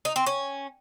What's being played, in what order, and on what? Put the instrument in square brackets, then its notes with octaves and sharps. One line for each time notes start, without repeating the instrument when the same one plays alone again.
[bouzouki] D#4
C4
C#4